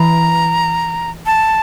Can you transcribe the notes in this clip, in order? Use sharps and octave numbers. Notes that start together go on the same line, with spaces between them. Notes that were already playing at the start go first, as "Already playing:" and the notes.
Already playing: E3 A#5
A5